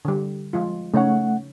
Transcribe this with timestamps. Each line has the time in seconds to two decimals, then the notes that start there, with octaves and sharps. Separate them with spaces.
0.05 D3 G3
0.53 F3 G#3 F4
0.94 C#3 A3 D#4 C#5 F#5